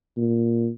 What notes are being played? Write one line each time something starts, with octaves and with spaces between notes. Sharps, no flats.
A#2